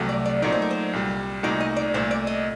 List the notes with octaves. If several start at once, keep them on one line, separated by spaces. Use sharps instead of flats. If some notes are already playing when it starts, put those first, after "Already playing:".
Already playing: C2 C3 F#3 A3
D5
D5
A#2 F#3 A3 D#4 D5
C5
A#4
C5
C2 A#2 G3
C2 A#2 A3 D#4 F#4 D5
D#5
D5
C2 A#2 A3 C5
D5
D#5